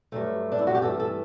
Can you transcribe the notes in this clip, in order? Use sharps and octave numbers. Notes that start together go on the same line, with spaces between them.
G2 F#3 A3
D4
E4
F#4
G4
G2 E3 A3 A4
A4